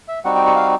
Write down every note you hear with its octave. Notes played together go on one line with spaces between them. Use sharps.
E5
G3 C4 D#4 F#4 F#5
G5
F#5
F5